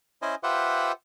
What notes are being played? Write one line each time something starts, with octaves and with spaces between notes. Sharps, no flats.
C#4 E4 C5 D#5 G#5
F4 G4 B4 C5 E5 F#5